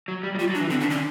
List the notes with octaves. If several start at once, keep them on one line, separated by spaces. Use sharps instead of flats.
F#3
G3
F#3
G3 F4
F#3
D4
E3
D3 C4
C#3 D4
D3 C#4